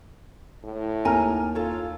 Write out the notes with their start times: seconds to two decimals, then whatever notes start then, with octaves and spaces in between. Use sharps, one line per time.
0.64 A2
1.05 D#2 A#4 G#5 A#5 F6
1.55 F4 A4 C#5